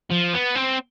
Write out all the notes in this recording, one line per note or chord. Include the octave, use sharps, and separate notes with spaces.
F3
B3
C4